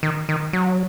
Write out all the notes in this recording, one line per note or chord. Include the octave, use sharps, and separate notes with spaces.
D#3
D#3
F#3